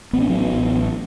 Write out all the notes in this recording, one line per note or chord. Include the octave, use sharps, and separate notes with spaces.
A1 B3
C#4
F#3 B3
A1